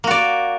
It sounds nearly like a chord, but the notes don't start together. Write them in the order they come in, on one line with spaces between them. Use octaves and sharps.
A#3 F#4 D5